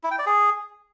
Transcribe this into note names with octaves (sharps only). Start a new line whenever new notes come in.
E4
G5
D5
G#4